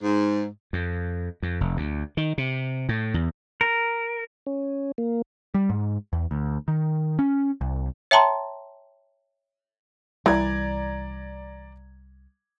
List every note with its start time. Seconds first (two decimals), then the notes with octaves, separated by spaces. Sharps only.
0.02 G#2
0.73 F2
1.42 F2
1.61 F1
1.77 D2
2.17 D#3
2.38 C3
2.89 A2
3.14 E2
3.61 A#4
4.46 C#4
4.98 A#3
5.54 G3
5.70 G#2
6.13 E2
6.31 D2
6.68 D#3
7.19 C#4
7.61 C2
8.11 C#5 E5 G5 A5 A#5 C6
10.26 C2 E3 G3 D5 A#5 G#6